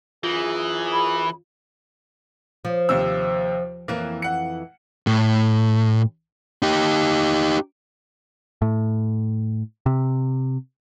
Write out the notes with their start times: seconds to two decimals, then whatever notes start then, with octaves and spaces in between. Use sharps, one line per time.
0.24 F#2 E3 F4 G#4
0.93 B5
2.65 F3
2.89 D#2 C3 E6
3.88 F2 E3 A#3
4.22 F#5 C#7
5.07 A2
6.62 D#4 G4
8.62 A2
9.86 C3